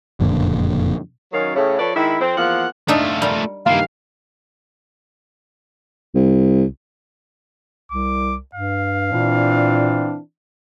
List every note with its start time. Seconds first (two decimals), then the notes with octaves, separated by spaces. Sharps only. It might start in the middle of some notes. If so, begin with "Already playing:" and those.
0.20 F#1 F2 A#2 D3
1.32 F#2 D#3 F#3 C#4 F5
1.55 A2 C#3
1.79 F3 A4 B4 C#5 D5
1.95 D#3 G#3 E4
2.20 F2 C4
2.37 E2 F3 A#3 F#5
2.88 A3 D4 D#4 F4 E5
3.22 G3 A#4
3.67 G2 D#3 A#3 E4 F5
6.15 C2
7.92 C2 D6
8.55 G2 F5
9.12 A#2 E3 C4 D4